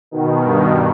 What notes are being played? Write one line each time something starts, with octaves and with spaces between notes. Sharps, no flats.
B2 D#3
G2